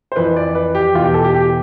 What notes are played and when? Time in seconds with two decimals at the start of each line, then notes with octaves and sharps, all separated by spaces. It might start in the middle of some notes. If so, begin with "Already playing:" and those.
0.12 C5
0.16 F2 E3 B4
0.36 D5
0.55 B4
0.75 G4
0.95 E2 B2 F4
1.04 G4
1.14 A4
1.24 G4
1.34 G4